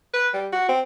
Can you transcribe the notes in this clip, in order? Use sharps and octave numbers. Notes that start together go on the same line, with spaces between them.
B4
G3
F#4
C4